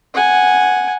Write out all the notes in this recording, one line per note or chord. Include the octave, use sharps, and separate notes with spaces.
F#5 G#5